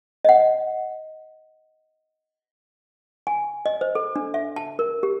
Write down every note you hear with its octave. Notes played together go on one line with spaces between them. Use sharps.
D#5 F#5
G#5
D#5
C5
A4
D4
E5
A5
A#4
G4